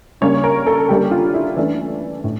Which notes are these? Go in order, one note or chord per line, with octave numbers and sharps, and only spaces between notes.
C#3 G3 A#3 C#4 C#5
A#4
A4
D3 G3 A#3 C#4 G4
F4
E4
E3 A3 C#4 D4
A2